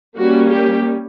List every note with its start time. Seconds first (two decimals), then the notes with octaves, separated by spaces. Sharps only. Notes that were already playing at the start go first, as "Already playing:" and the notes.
0.17 G3 A#3 C#4 F#4
0.52 G4